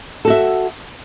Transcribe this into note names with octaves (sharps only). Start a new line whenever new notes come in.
F#4 A4 E5